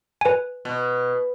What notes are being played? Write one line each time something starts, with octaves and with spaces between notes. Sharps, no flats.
B4 G#5
B2